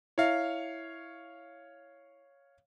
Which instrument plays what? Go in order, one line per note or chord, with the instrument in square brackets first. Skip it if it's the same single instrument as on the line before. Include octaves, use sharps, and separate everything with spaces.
[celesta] E4 E5 [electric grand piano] C#5 F5